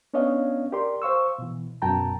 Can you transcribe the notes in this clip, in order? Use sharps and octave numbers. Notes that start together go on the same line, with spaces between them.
B3 C#4 D4 C#5 D#5 F5
G4 A#4 D5 C6
C5 F5 C#6 E6
B2 E3
C2 F#2 B2 G5 A5 A#5